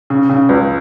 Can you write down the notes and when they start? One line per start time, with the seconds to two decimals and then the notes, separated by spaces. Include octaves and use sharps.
0.10 C#3
0.29 C#3
0.49 C#2